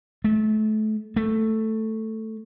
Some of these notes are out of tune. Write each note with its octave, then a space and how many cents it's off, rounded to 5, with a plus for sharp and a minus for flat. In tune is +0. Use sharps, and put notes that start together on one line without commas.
A3 -30
A3 +5